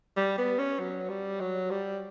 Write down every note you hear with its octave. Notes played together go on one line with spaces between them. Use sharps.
G3
B3
C#4
F#3
G3
F#3
G3